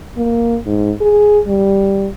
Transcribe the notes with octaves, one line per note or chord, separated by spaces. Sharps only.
A#3
G#2
G#4
G3